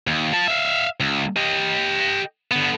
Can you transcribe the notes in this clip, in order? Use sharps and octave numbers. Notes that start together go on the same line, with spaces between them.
D#2
F4 A5
E5 F5
C#2
G4 D#5
D3 B3